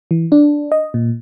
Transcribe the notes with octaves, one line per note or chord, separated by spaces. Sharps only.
E3
D4
D#5
A#2